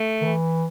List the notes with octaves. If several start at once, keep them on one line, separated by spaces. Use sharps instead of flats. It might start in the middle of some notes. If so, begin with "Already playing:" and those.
Already playing: A3
D#3
E3